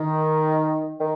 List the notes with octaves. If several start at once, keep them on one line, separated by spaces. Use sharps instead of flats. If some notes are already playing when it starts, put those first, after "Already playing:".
Already playing: D#3
D#3